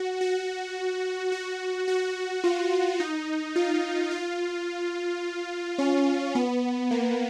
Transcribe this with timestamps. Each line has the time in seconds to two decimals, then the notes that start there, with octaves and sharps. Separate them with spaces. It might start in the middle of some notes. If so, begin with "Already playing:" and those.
Already playing: F#4
0.21 F#4
1.32 F#4
1.88 F#4
2.44 F4
3.00 D#4
3.56 F4
4.11 F4
5.78 C#4
6.35 B3
6.91 A#3